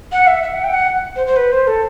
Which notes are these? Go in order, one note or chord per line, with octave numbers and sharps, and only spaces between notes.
F#5
E5
E5
F#5
G5
F#5
C5
C5
B4
C5
A4